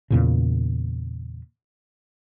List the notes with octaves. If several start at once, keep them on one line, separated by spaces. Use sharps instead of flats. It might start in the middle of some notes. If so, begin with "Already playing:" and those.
E2 A#2 C#3